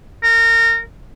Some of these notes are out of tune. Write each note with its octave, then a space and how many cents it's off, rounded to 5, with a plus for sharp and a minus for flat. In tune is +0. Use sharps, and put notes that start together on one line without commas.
A#4 -25